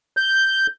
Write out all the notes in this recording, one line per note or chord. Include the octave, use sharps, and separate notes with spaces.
G6